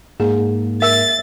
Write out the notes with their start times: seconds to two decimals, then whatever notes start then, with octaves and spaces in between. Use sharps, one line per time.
0.20 G#2 A#3 G#4
0.82 A#4 E5 A6